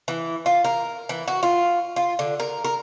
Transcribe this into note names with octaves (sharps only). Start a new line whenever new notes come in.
E3
F4
A#4
E3
F#4
F4
F4
D3
A#4
A#4